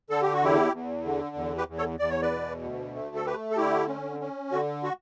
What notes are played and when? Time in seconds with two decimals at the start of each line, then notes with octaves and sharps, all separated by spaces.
0.10 D3 A4
0.22 G4
0.34 F#4
0.41 E2 E4 G4
0.73 E2
1.05 D3
1.36 E2
1.58 G4 B4
1.68 E2
1.78 A4 C#5
1.99 E2 D5
2.10 C#5
2.22 B4 D5
2.32 B2
2.63 D2
2.95 A3
3.16 A4
3.25 A3 G4 B4
3.51 A4
3.57 D3 E4 G4
3.88 C#4
4.20 C#4
4.52 D3 F#4
4.84 F#4